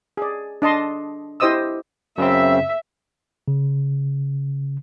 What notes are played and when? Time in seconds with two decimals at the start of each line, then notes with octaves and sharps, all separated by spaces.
0.17 G#4 D5
0.62 D4 D#5 A5 C6
1.40 E4 G4 C5 D#5 D#6 E6
2.18 F#2 C#3 C4 E5
3.48 C#3